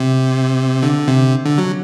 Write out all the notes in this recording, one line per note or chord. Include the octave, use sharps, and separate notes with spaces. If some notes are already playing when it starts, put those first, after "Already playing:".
Already playing: C3
D3
C3
D3
F#3